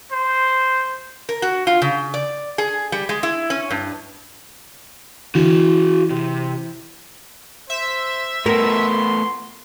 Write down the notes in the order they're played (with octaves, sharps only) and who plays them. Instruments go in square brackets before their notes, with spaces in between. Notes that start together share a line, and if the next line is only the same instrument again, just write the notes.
[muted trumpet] C5
[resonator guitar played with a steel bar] A#4
F#4
F4
C#3
D5
G#4
G3
G#3
E4
C#4
G2
[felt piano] E3 E4 [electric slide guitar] F#4 G#4
[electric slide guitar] C3
[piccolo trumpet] C5 [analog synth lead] E5
[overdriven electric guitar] A2 B3 [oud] A#4 [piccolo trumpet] C6